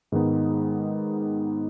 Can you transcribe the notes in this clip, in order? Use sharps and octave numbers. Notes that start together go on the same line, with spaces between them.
G#2 D#3 G#3 B3 D#4